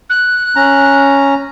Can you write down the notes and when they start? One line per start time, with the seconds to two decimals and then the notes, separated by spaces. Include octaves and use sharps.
0.10 F#6
0.56 C#4 A#5